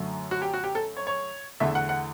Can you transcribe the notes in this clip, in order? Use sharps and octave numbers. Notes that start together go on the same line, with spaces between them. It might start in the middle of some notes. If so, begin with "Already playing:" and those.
Already playing: F#2 D3 F#3 A3
F#4
G4
F#4
G4
A4
C#5
C#5
E2 D3 A3 E5
F#5
F#5